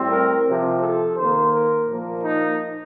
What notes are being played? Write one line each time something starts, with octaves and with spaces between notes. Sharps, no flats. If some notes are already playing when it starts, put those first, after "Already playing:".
Already playing: A2 G3 C4
A#4
C3 F3 C4
A4
D#3 A#3 C5
A#4
A#2 F3 A#3
D#4